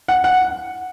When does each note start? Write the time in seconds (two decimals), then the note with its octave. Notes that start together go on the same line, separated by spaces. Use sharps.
0.08 F#5
0.24 F#5